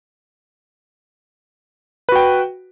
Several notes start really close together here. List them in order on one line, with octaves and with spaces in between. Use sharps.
B4 F#4 G5